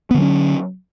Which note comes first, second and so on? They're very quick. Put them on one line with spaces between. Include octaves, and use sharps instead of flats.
B3 D3 F#3 C#4